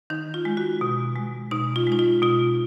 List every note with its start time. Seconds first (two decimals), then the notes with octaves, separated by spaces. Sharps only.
0.10 D#3 D#4
0.34 F4
0.45 G#3
0.57 F#4
0.81 B2
1.16 G#3
1.51 B2 D#4
1.76 F4
1.87 G#3 D#4
1.99 F4
2.22 B2 F4